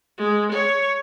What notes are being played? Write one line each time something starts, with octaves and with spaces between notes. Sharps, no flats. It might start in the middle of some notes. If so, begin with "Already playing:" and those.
G#3
C#5